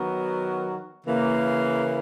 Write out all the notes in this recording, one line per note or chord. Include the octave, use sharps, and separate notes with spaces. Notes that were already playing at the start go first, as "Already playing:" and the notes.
Already playing: D#3 F#3 B3 F#4 A#4
C#3 E3 A#3